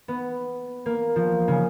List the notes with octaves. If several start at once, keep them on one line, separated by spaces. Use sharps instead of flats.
B3
A#3
F3
C#3